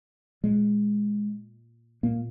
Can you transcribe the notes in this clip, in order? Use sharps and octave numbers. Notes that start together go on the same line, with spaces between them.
A#2 G#3
A#2 A#3